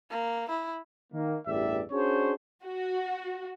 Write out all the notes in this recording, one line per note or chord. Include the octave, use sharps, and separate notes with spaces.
A#3
E4
D#3 A#3
A1 E2 G2 G4 D5 E5
C#4 D4 F#4 G#4 C5 C#5
F#4